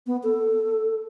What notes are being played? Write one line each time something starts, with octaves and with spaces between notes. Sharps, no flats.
B3
A4